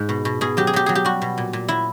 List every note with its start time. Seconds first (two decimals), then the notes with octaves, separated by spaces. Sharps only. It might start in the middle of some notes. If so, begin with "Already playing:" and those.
Already playing: G#2 G#3
0.09 B2
0.25 B2
0.41 B2 G#4
0.57 F#3 G4
0.67 G#4
0.73 F#3 G4
0.86 F#3 G#4
0.95 G4
1.05 G3 F#4
1.22 B2
1.38 A#2
1.53 A#2
1.68 F#3 E4